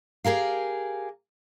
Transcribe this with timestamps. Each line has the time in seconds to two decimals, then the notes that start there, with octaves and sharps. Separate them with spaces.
0.24 G4 G#4 A#4 F5